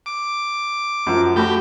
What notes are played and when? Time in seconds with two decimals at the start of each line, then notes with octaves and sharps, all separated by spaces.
0.06 D6
1.07 F#2 F3
1.36 A3 F#4 G4 B5